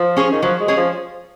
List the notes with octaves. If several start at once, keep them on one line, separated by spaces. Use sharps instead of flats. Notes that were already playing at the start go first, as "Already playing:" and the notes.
Already playing: F3
C#4 G#4 C#5
D#3
F3 F#3
G#3
C#4 G#4 C#5
F3